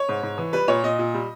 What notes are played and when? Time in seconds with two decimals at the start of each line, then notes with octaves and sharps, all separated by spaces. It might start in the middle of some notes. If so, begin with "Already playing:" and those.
Already playing: C#5
0.09 G#2
0.23 G#2
0.38 E3
0.53 G3 B4
0.68 A#2 C#5
0.83 A#2 D#5
0.99 A#2
1.14 G3